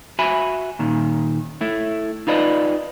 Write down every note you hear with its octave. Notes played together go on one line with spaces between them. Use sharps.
F#4 E5 G#5 B5
A#2 D#3
A3 E4
D#4 F4 B4 D5 D#5